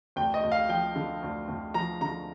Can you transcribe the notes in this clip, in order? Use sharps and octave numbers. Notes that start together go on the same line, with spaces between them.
D2 G5
D#5
D2
F5
F3 G5
D3
D2
D2
F3 A#5
D3 A#5